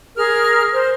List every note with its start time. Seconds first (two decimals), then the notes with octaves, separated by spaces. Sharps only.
0.16 G#4 A#4 F6
0.73 C5